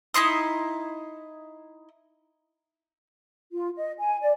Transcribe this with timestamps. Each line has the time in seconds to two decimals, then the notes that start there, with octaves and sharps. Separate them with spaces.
0.14 D#4 E4 C6 D#6
3.52 F4
3.76 D#5
3.99 G#5
4.21 D5